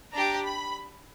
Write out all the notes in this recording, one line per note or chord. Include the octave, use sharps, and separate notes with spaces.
D4 G4 A#5
B5